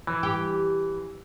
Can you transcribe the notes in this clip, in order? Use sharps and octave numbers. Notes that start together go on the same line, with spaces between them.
E3
G4